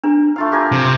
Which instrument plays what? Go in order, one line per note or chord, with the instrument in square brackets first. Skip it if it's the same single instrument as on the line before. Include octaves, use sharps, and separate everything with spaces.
[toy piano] D4 [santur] A#4
[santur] A3 F4 F5
G4 A#4 G#5
[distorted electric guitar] C3